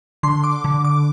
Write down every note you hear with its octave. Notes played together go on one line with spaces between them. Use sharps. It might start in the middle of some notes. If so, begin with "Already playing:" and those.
D3 C6
D6
D3
D6